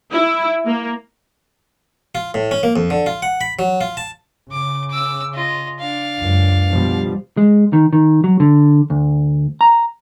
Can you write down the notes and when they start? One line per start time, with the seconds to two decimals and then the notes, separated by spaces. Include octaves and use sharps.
0.12 E4
0.66 A#3
2.15 F4
2.34 A2
2.51 C#4
2.63 A#3
2.76 F2
2.90 D3
3.06 F4
3.22 F#5
3.41 B5
3.59 F#3
3.81 F4
3.97 A5
4.51 C#3 D6
4.90 D6 E6
5.34 F4 D#5
5.79 D4 F5
6.19 C#2 F#2
6.70 B2 F3 G3
7.37 G#3
7.73 D#3
7.93 D#3
8.24 F#3
8.40 D3
8.90 D2
9.61 A#5